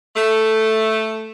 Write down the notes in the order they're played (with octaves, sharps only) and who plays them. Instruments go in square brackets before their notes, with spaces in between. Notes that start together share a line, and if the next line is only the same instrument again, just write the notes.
[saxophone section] A3